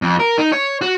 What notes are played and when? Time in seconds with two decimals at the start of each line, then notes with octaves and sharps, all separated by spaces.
0.02 F2
0.20 A#4
0.38 D#4
0.52 C#5
0.81 F#4